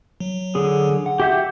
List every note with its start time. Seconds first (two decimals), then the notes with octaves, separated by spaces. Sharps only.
0.20 F#3
0.55 D3 G#4
1.06 F#5
1.20 G4 E5 G6